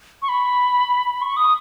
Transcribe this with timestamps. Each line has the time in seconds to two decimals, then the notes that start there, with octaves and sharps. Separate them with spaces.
0.22 C#6
0.29 B5
1.22 C#6
1.37 D#6